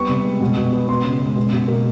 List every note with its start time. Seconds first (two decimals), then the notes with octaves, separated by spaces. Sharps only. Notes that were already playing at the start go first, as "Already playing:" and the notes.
Already playing: G3 B3 C#6
0.09 C3
0.25 G#3
0.41 B2
0.57 B2
0.73 B3
0.88 B3 C6
1.04 C#3
1.20 G#3
1.36 B2
1.53 B2
1.68 A#3